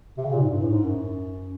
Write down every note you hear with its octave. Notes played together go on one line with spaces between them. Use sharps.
C3
C#3
A#2
G#2
G2
A2
G#2
F#2